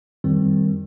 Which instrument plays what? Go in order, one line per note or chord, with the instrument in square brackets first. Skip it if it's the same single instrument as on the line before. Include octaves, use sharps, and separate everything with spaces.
[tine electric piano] F2 D#3 G3 C4